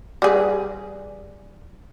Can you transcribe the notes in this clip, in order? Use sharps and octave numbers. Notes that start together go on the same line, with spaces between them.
G3 G#4 B4